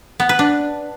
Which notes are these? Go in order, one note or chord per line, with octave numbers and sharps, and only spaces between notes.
B3
B4
D4